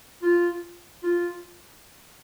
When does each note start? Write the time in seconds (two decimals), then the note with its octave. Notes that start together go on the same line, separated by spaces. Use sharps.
0.22 F4
1.03 F4